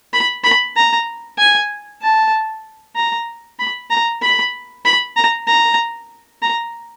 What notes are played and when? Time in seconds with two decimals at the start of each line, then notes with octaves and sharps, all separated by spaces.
0.13 B5
0.44 B5
0.76 A#5
1.38 G#5
2.02 A5
2.96 A#5
3.59 B5
3.90 A#5
4.22 B5
4.85 B5
5.16 A#5
5.47 A#5
6.42 A#5